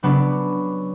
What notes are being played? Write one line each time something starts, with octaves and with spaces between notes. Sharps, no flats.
C#3 F#3 B3 D4